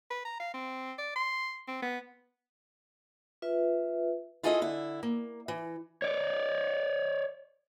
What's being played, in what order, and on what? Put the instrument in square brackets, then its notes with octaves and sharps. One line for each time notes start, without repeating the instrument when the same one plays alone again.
[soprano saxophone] B4
A#5
F5
C4
D5
C6
C4
B3
[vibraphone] F4 B4 E5
[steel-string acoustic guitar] E4 F4 G#4 A4 D5 D#5
D3 E4
A#3
E3
[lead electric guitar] C#5 D5